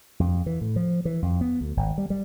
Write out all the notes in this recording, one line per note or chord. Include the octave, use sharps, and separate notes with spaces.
F2
E3
A2
F3
E3
F2
B3
D2
G#1
G3
G3